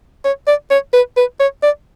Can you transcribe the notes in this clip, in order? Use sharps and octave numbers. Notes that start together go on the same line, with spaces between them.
C#5
D5
C#5
B4
B4
C#5
D5